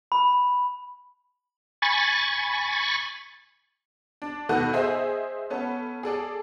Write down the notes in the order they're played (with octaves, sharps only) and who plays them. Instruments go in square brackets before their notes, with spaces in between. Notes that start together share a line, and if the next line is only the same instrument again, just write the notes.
[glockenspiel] B5
[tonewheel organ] G#5 B5 C#6 A6
[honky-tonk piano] D4
B2 D#3 A3 B3 F#4 A4
G#4 C5 D#5 E5 G5 G#5
B3 C#4 A4
G#4 A4 D5